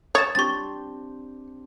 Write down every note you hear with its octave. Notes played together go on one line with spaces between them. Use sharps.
C#5 D#6 A6 E7
C4 D4 G4 C#6 A6